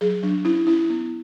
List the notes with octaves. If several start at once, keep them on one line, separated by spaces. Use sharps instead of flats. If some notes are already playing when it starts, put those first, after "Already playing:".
F#3 G#4
F#3 D4
C#4 E4
C#4 E4
B3